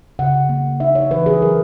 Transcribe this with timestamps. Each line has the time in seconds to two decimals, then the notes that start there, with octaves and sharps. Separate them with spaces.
0.19 C#3 F#5
0.49 A#3
0.80 D#4 E5
0.95 C#5
1.11 E3 B4
1.26 G#4
1.42 F#3 A#4